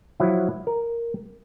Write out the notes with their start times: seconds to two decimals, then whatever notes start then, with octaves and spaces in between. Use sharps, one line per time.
0.20 F3 F#3 E4
0.67 A#4